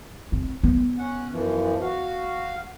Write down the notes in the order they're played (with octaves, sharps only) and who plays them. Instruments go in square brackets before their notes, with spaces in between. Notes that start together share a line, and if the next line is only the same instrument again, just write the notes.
[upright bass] C4
B3
[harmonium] C#4 F#5
F#2 E3 F3
F#4 F5